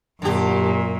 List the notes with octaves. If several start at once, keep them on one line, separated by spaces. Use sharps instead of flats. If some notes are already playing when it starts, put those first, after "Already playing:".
F#2 A#2 D3 G4